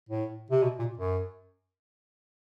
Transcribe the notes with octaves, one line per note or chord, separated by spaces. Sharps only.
A2
C3
B2
A#2
F#2